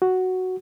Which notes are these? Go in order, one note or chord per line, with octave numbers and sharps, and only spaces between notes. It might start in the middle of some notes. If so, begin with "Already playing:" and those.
F#4